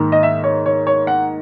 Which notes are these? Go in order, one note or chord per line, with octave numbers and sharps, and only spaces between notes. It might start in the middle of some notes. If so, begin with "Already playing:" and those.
Already playing: G#2 D#3 A#3
D#5
E5
C#5
C#5
C#5
F#5